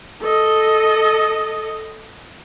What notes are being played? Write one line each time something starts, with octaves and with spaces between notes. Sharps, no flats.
A4 D#5